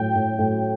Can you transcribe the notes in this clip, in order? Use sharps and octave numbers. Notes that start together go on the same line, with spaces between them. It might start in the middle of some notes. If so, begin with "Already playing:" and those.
Already playing: A2 F#3 G5
A2
A2